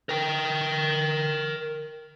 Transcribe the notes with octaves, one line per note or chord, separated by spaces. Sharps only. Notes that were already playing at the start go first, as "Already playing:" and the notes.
A#4 G5